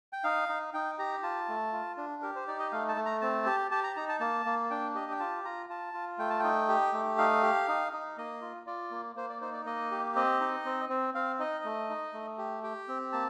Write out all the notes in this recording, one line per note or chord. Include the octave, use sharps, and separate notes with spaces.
G5
D#4 F5
D#4
D#4 G5
G4 A#5
F4 A5
A3
F4
D4
G4 A#4
C5
D#4 D5
D#5
A3 F5
A5
A3
A#5
C4 A5
G4
G4 A5
A#5
D#4 A#5
A5
A#3 A5
A#3
D4 G5
G4 D#5
G5
F4 A5
F4 A#5
F4 A5
F4
A3 G5
A5
D#4 G5
G4
A3
D#4 F5
G4
D#4
D#4
A#3 D#5
F4
F4 D5
A#3
A#3 C5
D5
D#4 C5
D5
A#3 D#5
G4
C4 D#5
D#4
C4
C4
C4 F5
D#4 D#5
A3
D#4
A3
G4
G4 G5
C4
A#3 A5